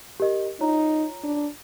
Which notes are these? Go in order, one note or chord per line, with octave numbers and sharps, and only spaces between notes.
G4 A#4 D#5
D#4 F4 C#5 A#5
D4